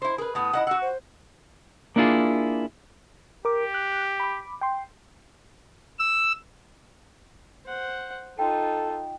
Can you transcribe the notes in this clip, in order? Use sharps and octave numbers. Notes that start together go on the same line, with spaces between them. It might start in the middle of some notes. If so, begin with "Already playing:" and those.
E4 C5 C6
G#4 A#4 B4
A2 B3 D#6
E4 D#5 F#5
F#4 F#5 E6
C5
A#3 D4 E4 F4 G#4
G4 A#4 D6
F#6
B5 D6
G5 C6
E6
C5 F#5
D#4 F4 A4 G5